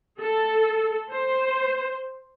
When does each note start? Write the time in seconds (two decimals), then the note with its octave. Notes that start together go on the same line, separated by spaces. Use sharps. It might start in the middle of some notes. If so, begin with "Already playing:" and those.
0.19 A4
1.11 C5